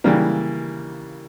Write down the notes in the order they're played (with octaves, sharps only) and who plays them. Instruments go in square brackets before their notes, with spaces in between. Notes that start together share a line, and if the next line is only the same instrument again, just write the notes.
[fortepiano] C#3 E3 G3 A#3